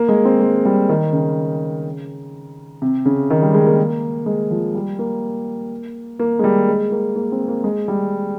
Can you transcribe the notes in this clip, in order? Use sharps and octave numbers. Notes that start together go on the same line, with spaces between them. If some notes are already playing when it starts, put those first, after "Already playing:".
Already playing: A#3
G#3
C4
G#3
G3
D#3
C#3
C3
C#3
D#3
G3
G#3
A#3
G#3
F3
G3
A#3
A#3
G#3
G3
G#3
A#3
A#3
C4
A#3
G#3
G3